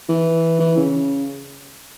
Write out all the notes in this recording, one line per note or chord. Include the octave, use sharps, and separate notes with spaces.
E3
E3
C#3